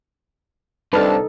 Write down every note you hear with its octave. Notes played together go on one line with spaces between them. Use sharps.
C2 D4 D#4 A4 B4 A5 F6